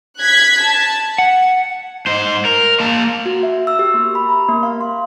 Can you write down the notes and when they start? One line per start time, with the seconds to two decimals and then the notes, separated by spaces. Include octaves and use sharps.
0.19 F#6 G#6 B6
0.62 A5
1.18 F#5
2.07 G#2 C5
2.45 A#4
2.80 A#3 A5
3.26 F#4
3.43 E5
3.67 E6
3.79 G4
3.94 A#3
4.15 B5
4.29 A#5
4.49 A#3
4.63 F5
4.81 C6